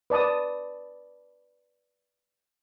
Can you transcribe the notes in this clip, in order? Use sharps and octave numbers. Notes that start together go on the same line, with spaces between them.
B4 D5 A5 D#6